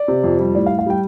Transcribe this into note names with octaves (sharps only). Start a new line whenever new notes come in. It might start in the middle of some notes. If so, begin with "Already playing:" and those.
Already playing: D5
C3
F2
G3
A2 D5
F5
A2
F5
G3 G5